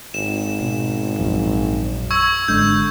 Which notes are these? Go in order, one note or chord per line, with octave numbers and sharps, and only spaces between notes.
G#1 E7
B2
A#1 F#2 F3
C#6 E6 G#6
G#1 D3 G#3 D4 G6